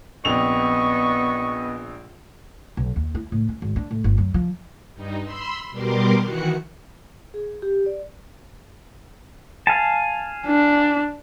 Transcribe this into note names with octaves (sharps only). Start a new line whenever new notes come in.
A#1 B3 C4 D#5 C#6 F7
B1
D#2
E4
A2
C#4
G#1
D4
A2
G1
F#2
F3
G2 D#4
B5 C6 E6
B2 G3 A#4 C6 D6
D#3 E3 F#4 F#6 C#7
G#4
G4
D5
F5 G#5 A5
D4